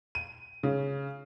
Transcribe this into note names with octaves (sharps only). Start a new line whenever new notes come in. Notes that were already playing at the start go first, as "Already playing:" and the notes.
D#7
C#3